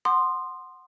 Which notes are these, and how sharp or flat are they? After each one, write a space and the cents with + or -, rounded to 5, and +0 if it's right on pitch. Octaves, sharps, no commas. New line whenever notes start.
F#5 +0 C6 +0 D#6 -30